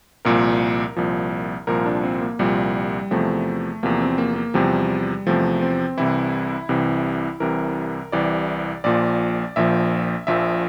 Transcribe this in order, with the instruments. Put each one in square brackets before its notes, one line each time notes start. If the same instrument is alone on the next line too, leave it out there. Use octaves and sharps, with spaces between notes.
[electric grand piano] C2 A#2 F3 A#4
C2 A#2 F3
C2 A#2 F3 A#4
D4
C4
A#3
C2 A#2 F3 G3
E2 C3 F3 A3
E2 C3 F3 A#3
C4
A#3
A#3
E2 C3 F3 G3
E2 C3 F3 A3
C4
C2 C3 E3 E4
C2 C3 E3
C2 C3 E3 A#4
C2 C3 E3 D5
A#1 A#2 F3 D5
A#1 A#2 F3 E5
A#1 A#2 F3 E5